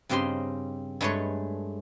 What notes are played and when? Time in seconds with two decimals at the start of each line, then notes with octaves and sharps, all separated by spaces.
0.09 G2 C#3 C4 G4 D#5 C6
1.01 G2 G#3 A3 B4 C#5